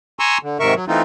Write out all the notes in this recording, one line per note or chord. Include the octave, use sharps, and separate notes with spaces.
G#5 A#5 C6 C#6 E6
D3
G#2 C3 D#3 A#4 E5 C#6
F#3
E3 A3 C4 D#4 F4